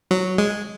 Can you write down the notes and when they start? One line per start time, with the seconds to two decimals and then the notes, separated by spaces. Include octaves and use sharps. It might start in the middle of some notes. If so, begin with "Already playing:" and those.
0.11 F#3
0.38 G#3